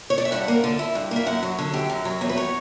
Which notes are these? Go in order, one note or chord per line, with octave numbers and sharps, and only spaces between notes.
C#5
D5
E5
G2 F#5
A#3
D3
E4
G2
A#3 E5
F#2 F#5
F#3
D3
F#2 G4
F#2
F#3
E2 C#5
B4
F#3 C#5